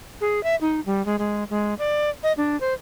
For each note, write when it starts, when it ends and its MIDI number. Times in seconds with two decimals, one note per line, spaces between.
0.21 0.42 68
0.43 0.55 76
0.61 0.80 63
0.86 1.04 55
1.06 1.16 56
1.19 1.44 56
1.50 1.74 56
1.79 2.10 74
2.23 2.33 75
2.37 2.59 62
2.61 2.74 72